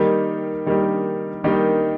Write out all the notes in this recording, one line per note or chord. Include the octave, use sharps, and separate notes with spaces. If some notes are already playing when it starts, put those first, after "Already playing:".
Already playing: D#3 G3 A#3 D#4 G4
D#3 G3 A#3 D#4 G4
D#3 G3 A#3 D#4 G4